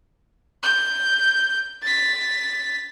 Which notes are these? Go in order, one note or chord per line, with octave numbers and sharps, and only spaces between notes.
G6
A6 B6